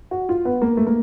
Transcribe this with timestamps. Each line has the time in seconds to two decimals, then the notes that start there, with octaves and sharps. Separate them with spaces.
0.11 F#4
0.29 F4
0.45 B3
0.62 A#3
0.77 A3
0.87 A#3